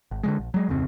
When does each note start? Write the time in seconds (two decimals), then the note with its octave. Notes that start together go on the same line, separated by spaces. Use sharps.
0.11 G#1
0.23 D3 E3 G#3
0.39 A#1
0.54 F#3 G#3
0.69 D1 F2 C#3 C4